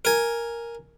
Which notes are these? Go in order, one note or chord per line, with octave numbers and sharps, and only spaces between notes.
A#4 G#5